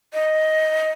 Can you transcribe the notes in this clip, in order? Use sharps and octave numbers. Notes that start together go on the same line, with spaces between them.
D#5